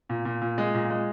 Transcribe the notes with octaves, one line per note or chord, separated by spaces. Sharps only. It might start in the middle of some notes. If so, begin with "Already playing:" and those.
A#2
A#2
A#2
G#3
A#2
G#3